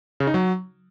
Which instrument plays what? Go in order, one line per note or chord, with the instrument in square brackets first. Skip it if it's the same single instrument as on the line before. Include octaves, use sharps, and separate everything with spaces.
[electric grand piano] C#3
D#4
F#3